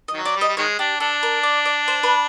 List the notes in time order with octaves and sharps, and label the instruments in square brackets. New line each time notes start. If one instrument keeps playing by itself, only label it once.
[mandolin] D#5
[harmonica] D#3 F#3
[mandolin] D5
[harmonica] G3
[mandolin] D#5
[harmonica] G3
[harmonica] D#3 G#3 [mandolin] C#5
[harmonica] D4 [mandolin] G4
[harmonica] D4 [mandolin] A4
[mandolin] A#4
D5
D5
C5
B4